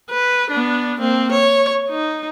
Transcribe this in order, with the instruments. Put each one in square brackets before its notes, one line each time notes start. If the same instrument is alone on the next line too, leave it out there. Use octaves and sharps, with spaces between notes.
[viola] B4
B3 D4
A#3 C4
C#5
D#4